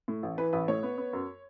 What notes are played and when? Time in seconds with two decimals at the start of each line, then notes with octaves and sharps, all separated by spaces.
0.08 A2
0.23 A1
0.38 E3 B4
0.53 A1 B4
0.68 A2 C#5
0.83 B3
0.98 B3
1.13 F#2